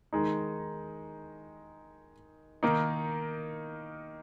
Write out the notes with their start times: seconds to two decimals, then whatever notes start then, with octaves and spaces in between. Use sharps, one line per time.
0.13 D#3 G#3 D#4
2.63 D#3 A#3 D#4